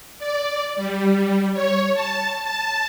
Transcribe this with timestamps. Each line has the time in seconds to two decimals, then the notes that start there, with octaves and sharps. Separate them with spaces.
0.19 D5
0.76 G3
1.53 C#5
1.94 A5
2.44 A5